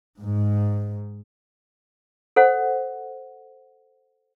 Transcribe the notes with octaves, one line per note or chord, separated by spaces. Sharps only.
G#2
A4 C5 F#5